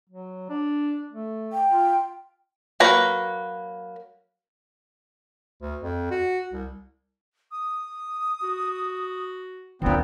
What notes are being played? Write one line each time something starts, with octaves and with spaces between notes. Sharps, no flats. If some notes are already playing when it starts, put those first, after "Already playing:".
F#3
D4
A3
G5
F4
F#3 A#3 B4 C#5 A#5
D2
F2
F#4
C2
D#6
F#4
D#2 A#2 B3 C4 D4